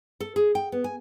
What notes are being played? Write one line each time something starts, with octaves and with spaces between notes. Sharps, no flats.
A4
G#4
G5
B3
G#5